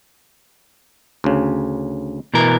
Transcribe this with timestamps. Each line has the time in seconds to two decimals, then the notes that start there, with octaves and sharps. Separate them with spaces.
1.24 D2 C#3
2.34 B2 E3 A#4